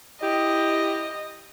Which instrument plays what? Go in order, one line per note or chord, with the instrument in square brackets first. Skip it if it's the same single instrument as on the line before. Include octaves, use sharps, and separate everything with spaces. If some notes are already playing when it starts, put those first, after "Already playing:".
[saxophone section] E4 G4 [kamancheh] D#5